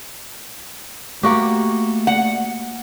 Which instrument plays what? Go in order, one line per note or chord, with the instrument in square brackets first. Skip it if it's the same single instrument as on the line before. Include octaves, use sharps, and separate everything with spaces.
[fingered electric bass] A3 [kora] A#3 F#4 G4
[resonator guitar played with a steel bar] F#5